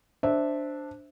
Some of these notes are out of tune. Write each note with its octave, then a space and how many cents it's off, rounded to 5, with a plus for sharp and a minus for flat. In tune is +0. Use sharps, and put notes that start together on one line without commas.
D4 +0 C5 +0 E5 -10